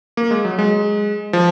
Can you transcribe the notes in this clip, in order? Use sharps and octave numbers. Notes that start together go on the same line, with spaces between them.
A#3
G#3
F#3
G#3
F3